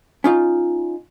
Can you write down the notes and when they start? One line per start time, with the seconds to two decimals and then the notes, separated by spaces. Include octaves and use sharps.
0.24 C#4 D#4 F4